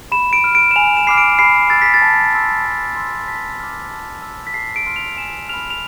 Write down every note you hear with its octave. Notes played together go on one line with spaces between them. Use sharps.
B5 E7
D7
F6
D7
E7
G#5 F7
E7
B5 D6 F6 C7
D7
B5 C7
E6 A6
B6
A6
A5
C6 E6
A5
C6 E6
A5 B6
D6 F6
A5
E6
B6
A5 C7
D7
C6 F6
F7
G#5 E7
B5 F6 F7
F7